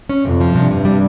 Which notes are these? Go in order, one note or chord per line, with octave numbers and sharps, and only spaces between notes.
C#4
F2 C3
F3
G2 C3
C3
G3